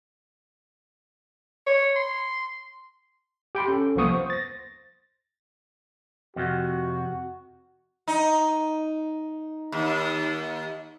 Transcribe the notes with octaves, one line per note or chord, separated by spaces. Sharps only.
C#5
C6
G4 G5 B5 C6
C#4 A4
C2 F3 A#3 B3 C#6 D#6
C5
A6 A#6
F2 C3 F#4
D#4
D#2